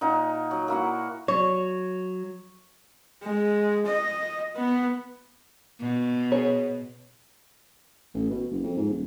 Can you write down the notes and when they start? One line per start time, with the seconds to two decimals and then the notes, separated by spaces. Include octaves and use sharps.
0.01 A#2 D#4 A#4 F#5
0.51 F#3
0.68 A#3 E4 F#4 F#5
1.28 F#3 C#5
3.23 G#3
3.87 D#5
4.56 B3
5.81 B2
6.32 G#4 C#5
8.14 A1
8.30 B2
8.51 F#1
8.63 F2
8.77 G#2
8.89 D#1